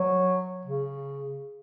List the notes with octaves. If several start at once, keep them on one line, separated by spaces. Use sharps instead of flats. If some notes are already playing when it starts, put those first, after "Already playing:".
Already playing: F#3
C#3